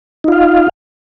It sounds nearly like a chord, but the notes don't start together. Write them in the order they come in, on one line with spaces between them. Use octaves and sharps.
D#4 F4 F5